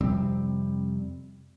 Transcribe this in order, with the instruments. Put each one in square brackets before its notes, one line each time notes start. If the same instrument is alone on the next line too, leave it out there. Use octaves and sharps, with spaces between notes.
[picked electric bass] F2 C3 G3 C4